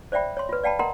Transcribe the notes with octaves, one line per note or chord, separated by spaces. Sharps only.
C5 D5 E5 G5 B5
C#5 C6
F4 B4
D5 F5 G5 A5 B5
A#4 D#5 F#5 A#5 C6